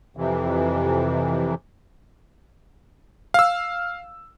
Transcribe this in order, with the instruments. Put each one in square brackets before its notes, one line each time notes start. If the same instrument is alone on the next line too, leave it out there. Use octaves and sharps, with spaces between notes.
[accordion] F2 C3 E3
[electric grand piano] F5 E6